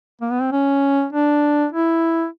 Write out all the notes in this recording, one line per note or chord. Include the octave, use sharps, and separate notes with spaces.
A#3
B3
C4
C#4
D4
E4